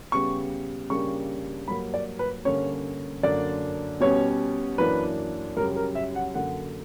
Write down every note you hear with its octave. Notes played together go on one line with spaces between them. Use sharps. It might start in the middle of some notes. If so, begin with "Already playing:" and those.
C#3 G3 B3 C#6
C#3 G3 A#3 D4 C#6
G2 F#3 A#3 B5
D5
B4
G2 D3 A#3 C#4 C#5
F#2 D3 A#3 D4 D5
B2 G3 C#4 C#5
F#2 E3 A#3 D4 B4
F#2 C#3 G3 A#4
A#4
E5
F#5
F#2 D3 A#3 F#5